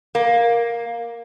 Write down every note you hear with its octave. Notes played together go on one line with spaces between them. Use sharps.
A#3